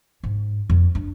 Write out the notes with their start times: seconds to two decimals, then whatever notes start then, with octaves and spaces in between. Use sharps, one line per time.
0.23 G#2
0.70 F2
0.95 D4